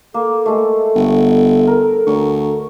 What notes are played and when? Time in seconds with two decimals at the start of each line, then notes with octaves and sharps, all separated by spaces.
0.14 A#3 A4
0.46 G#3 A3
0.96 G1
1.67 A#4
2.07 D2 C#5